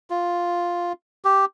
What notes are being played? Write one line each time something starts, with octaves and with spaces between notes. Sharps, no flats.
F4
G4